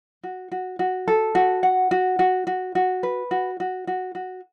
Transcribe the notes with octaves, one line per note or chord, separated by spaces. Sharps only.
F#4
F#4
F#4
A4
F#4
F#5
F#4
F#4
F#4
F#4
B4
F#4
F#4
F#4
F#4